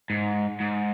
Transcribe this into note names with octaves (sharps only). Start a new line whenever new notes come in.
G#2
G#2